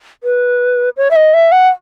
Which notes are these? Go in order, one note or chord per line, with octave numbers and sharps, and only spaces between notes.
B4
C#5
E5
D#5
E5
F#5